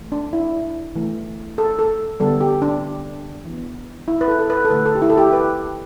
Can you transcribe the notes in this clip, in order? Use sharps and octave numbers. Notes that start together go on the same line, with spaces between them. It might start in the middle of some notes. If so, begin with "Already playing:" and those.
Already playing: E3 A3
D4
E4
E3 A3
A4
A4
D3 G3 B3 A4
G4
D4
E3 B3
E4
B4
A4
A4
B4
A4
D3 A3 B4
A4
G4
E4
A4
G4
B4